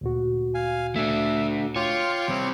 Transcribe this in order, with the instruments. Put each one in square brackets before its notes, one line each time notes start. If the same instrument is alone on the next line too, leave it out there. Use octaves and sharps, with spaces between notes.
[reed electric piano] D2 A#2 F#4
[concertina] F5 G#5
[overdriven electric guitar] A3 D4 [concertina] E5
[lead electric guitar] F4 [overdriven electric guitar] C#5 [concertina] G5 C6 D6
[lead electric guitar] G3 C4